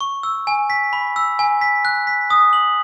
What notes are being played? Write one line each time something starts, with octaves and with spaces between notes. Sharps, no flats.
C#6
E6
G#5
B6
B5
E6
G#5
B6
F#6
B6
D#6
F#7